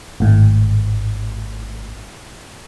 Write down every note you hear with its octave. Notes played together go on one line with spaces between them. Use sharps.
G#1 A2